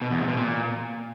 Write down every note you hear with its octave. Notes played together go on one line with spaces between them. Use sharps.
B2
E2
C3
B2
A#2